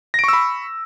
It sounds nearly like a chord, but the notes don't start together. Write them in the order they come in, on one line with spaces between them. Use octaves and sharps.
A#6 D7 C#6 E6 B5